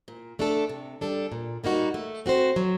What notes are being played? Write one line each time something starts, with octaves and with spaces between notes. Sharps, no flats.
A#2
A3 D4 A4
C3
G3 D4 A4
A#2
G3 A#3 D#4 F#4
A3
C4 F#4 C5
F#3